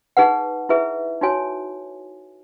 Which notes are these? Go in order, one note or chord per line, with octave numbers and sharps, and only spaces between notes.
D#4 G#4 B4 F#5
E4 G#4 B4 E5
D#4 F#4 C#5 G#5